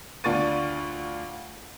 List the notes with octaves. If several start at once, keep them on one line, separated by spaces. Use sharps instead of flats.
D2 D4 F4 C#6 A6 D#7